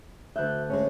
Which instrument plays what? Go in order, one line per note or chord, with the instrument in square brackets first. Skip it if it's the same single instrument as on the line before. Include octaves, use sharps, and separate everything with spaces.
[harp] D2 F#6 G6 [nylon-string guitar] E5
[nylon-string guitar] G#3 A3 C#4